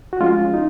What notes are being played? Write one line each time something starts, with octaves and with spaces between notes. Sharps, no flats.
F#4
F3 G#3 C#4 F4
D#4